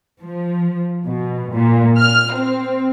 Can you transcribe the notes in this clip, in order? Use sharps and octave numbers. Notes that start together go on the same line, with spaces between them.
F3
B2
A#2
F6
C4